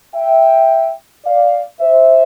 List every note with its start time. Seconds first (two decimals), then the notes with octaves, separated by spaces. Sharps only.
0.15 E5 G5
1.25 D5 F5
1.80 C5 E5